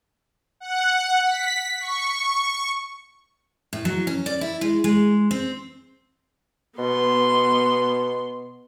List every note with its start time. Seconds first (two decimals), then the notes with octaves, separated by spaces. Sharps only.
0.60 F#5
1.26 B6
1.80 C#6
3.73 A2
3.85 F#3
4.07 C#4
4.26 D5
4.41 E4
4.61 G#3
4.84 G#3
5.31 C4
6.79 B2 B3 C6